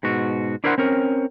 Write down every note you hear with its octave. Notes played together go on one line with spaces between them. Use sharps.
G#2 B2 F#4
D4 E4 A#4 C5 D5 F#5
C4 C#4 A#4